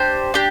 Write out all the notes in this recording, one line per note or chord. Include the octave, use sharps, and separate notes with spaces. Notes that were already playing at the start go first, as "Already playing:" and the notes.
Already playing: D4 G4 C5
D4 G4